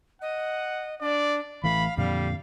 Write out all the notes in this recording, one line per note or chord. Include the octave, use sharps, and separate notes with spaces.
D#5 F#5
D4 D5
A1 E3 A3 F5 B5
F2 A#2 D3 G3 F5